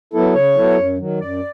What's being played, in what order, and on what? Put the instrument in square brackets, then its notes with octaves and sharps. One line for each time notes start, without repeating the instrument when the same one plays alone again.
[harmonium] F#3 B3 E4 A4
[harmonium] C#3 [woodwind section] C#5
[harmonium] F#3 B3 E4 A4
F#2
D#3 F#3
[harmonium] F#2 [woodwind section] D5